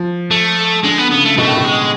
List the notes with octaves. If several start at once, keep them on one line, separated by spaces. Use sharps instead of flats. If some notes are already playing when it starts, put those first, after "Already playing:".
Already playing: F3
A3
D3 G#3
B3
C#3 B3
A3
B2 A3
A2
B2
G#3